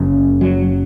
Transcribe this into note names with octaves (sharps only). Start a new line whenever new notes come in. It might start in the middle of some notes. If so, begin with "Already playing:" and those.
Already playing: F#1 F#2 C#3
F#3